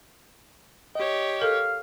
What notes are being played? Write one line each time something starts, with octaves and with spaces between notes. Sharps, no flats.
G4 C#5 D#5
A4 A#4 F5